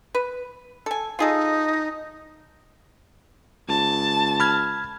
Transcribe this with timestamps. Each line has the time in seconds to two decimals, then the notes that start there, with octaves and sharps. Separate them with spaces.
0.15 B4
0.86 A4 G#5
1.19 D#4 F4 G#4 A4
3.69 C#2 A5
4.40 B5 F6 G#6